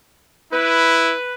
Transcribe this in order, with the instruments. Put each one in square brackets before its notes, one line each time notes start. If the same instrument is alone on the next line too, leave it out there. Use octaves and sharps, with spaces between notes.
[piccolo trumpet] E4 [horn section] B4